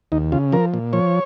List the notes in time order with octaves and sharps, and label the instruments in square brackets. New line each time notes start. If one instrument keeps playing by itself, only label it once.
[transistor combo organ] D#2 D#4
C#3 F4
F3 A#4
A#2
F3 C#5